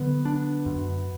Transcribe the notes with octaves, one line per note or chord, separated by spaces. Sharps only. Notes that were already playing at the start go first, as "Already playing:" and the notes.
Already playing: D3 F#3 B3
D4
F#2